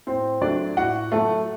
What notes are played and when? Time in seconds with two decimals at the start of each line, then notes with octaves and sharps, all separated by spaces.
0.07 A2 C4 C5
0.41 F#3 A3 D4 D5
0.77 A2 F#4 F#5
1.12 F#3 A3 A4